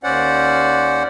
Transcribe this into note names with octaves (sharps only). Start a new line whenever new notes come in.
D#2 C#4 C5 D5 F#5